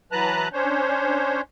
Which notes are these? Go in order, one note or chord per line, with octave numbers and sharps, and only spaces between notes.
E3 F#3 B4 A5 A#5 F#6
C#4 D4 C5 C#5